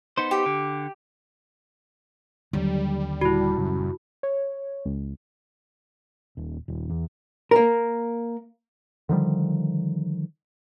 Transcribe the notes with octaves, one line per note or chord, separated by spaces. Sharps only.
B3 D#4 C5
G4
D3
D#2 D3 F#3 G3
D#1 E4 F#4
F#2 C#3 G3
C#5
C#2
D#1
D#1
E2
A#3 A#4
D3 D#3 F3 G3